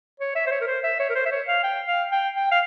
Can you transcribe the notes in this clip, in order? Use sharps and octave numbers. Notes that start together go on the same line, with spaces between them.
C#5
E5
C5
C#5
A#4
C5
E5
C#5
A#4
C5
E5
C#5
F5
G5
F5
G5
G5
F5